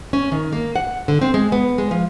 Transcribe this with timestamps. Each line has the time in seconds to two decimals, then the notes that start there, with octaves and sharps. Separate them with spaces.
0.13 C#4
0.32 D#3
0.52 A#3
0.76 F#5
1.08 D3
1.21 C4
1.34 G#3
1.52 B3
1.78 G#3
1.91 F3